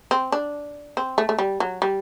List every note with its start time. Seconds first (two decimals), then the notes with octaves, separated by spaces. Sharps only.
0.11 C4
0.32 D4
0.97 C4
1.18 A3
1.29 A3
1.39 G3
1.60 F#3
1.82 G3